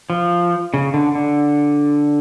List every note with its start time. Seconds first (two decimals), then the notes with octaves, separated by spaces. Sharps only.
0.10 F3
0.74 C#3
0.94 D3
1.15 D3